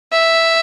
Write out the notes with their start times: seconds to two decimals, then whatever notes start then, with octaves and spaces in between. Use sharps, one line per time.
0.13 E5